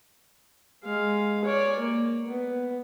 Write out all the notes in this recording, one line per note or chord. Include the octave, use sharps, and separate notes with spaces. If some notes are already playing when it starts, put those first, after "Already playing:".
G#3 F5
C#5 D5
A#3
B3